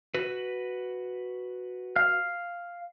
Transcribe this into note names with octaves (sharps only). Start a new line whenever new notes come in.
F#4 B4
F5